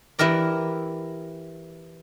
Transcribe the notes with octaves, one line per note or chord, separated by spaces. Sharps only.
E3 E4 G4 A#4 D5